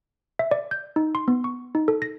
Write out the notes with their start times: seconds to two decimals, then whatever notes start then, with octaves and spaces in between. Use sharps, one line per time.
0.39 E5
0.51 D5
0.71 G6
0.96 D#4
1.15 C6
1.28 B3
1.44 C#6
1.75 D#4
1.88 A4
2.02 A#6